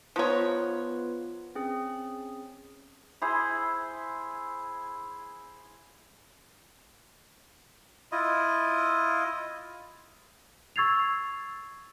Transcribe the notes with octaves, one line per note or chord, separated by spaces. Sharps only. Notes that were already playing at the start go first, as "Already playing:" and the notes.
F3 B3 D#4 F4 B4 C#5
C4 C#4 G#4
E4 G#4 C5
E4 F4 D#5
C#6 E6 G#6 A6 C7 F7